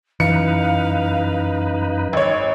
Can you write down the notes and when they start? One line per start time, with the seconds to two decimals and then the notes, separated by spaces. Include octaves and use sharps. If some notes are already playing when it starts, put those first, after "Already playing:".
0.20 F#2 E3 D#4 B4 F5 C#7
2.13 G#1 C#5